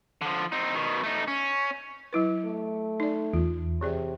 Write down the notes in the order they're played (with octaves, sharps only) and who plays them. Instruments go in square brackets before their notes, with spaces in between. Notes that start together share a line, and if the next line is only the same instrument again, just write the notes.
[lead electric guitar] D3 F3
C4 D#4
B2 D#3
A3 D#4
C#4
[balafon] F#3 E4 B4
[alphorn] A3
[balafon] D#4 D5
[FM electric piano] E2 [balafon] F4
[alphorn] C3 [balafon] E3 G#4 D5